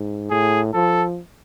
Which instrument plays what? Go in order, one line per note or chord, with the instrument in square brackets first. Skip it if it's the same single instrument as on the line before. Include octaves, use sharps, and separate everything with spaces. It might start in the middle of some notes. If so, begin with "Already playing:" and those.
Already playing: [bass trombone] G#2
[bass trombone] A2 [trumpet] G#4
[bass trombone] F3 [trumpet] A4